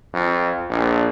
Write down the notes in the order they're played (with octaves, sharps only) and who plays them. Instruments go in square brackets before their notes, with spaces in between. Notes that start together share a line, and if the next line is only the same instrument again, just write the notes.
[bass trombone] F2
A#1